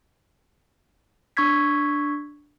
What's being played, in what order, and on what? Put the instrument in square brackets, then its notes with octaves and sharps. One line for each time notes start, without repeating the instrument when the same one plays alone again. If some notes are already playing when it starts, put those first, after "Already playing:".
[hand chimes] D4 C#6 E6 G#6 B6